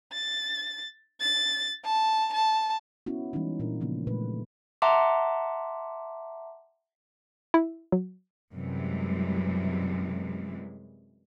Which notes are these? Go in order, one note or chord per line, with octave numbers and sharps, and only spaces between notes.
A6
A6
A5
A5
B3 C#4 E4 F#4
E3 G3 G#3 C#4 D#4
A#2 D4 A#4
C#3 F3 A#3 B3
A#2 G#3 A3 B4
E5 F#5 A5 A#5 C6 D6
E4
F#3
F#2 C3 E3 G3 G#3